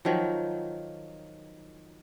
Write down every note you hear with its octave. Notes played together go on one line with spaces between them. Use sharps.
D#3 F3 F#3